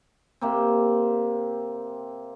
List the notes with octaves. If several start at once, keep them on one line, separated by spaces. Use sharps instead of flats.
C3 A#3 C4